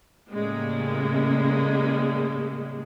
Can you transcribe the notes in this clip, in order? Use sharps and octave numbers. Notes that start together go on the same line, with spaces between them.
A2 C#3 G3 G#3 A#3